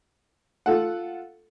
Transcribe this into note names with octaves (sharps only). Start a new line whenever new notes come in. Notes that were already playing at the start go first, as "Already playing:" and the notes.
F4 A4 F#5